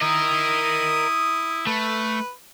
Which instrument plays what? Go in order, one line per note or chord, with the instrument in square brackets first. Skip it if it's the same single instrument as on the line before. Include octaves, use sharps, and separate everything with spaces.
[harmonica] E4 D#6 [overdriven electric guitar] A#4 D#5
[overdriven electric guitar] A3 [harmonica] B4